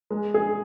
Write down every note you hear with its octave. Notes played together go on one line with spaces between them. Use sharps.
G#3
G#4